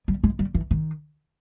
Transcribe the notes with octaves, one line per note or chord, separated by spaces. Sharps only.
G3
G#3
G3
E3
D#3